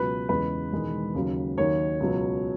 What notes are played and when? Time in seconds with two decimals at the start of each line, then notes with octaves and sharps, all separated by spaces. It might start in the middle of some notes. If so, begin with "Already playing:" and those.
Already playing: C#2 B2 F#3 B4
0.29 E2 C#3 G#3 B4
0.72 E1 E2 D#3 G#3
1.14 D#2 C#3 F#3
1.57 D#2 D#3 F#3 C#5
2.00 C#2 B2 F#3